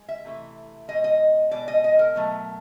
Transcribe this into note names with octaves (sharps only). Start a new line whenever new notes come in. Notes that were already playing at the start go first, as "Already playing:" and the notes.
Already playing: G#3
E5
C3 E3 A3
B2 G#3 D#5
D#5
B2 G#3 D5
D#5
D#5
A#4
B2 F#3 A3